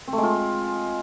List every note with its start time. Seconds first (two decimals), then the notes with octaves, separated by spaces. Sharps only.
0.08 C4
0.13 A3
0.18 G#3
0.23 F4